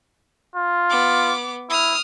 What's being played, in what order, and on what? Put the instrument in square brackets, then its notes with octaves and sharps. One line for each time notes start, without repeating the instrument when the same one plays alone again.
[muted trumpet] F4
[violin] B3 D6
[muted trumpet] E4 [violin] D#6 F6